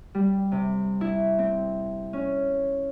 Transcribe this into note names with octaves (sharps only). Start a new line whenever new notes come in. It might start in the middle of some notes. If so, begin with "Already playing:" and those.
G3
C3
E4
C4
C#4